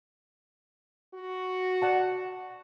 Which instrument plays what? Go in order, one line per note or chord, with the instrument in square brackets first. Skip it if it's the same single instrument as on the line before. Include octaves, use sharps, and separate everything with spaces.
[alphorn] F#4
[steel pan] D5 F#5 A5